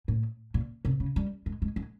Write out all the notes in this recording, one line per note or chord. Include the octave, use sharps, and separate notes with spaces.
A2
A#2
C3
C#3
G3
G#3
G#3
G#3